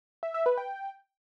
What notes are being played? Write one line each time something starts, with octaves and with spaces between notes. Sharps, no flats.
E5
E5
B4
G5